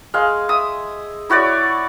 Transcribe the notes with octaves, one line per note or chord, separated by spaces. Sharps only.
G#3 F5
E5 D#6
E4 F#4 C#5 D5